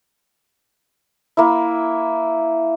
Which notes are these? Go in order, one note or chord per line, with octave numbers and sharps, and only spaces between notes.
A#3 E4